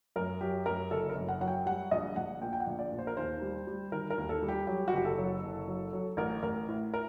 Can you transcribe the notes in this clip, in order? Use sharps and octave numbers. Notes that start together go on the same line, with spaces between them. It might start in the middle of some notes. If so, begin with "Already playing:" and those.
F#2 A#4
F#3 G4
F#2 A#4
F#1 A4
A#4
F#2
F#5
F#3 F#5
G5
G3 F#5
A#1 D#5
A#1 F#5
A#2 G5
G5
F#5
A#1
D5
A#2
C5
A#4
D#2 C5
G3
G3
D#3 A#4
A#4
D#2
A4
G3
G4
F#3 G4
F#4
F#1 G4
A4
F#3
F#1
F#3
F#3
A1 A#4
A1 A#4
A2
A#4